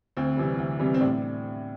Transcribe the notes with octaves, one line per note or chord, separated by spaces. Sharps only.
D2 C4
C3 E3 G3
D2
C3 E3 G3
C4
A2 D4